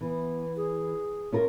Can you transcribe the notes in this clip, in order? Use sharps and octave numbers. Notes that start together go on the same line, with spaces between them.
E3 B3
G#4
C#4 F4 A#4